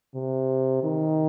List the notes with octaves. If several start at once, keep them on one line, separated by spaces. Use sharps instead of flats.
C3
D#3